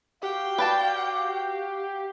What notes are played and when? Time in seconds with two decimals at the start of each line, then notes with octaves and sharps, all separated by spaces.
0.23 F#4 G4 F5 G5
0.58 B4 D5 A5